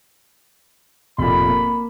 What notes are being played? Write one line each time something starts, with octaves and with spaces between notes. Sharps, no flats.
F1 A#2 B5
A#3